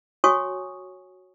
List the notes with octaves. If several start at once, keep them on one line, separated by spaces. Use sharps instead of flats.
F#4 C#5 G#5 C#6 D#6